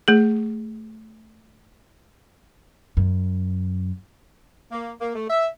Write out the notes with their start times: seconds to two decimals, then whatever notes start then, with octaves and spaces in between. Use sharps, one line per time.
0.08 A3 G#4
2.97 F#2
4.71 A#3
5.00 A#3
5.14 A3
5.30 E5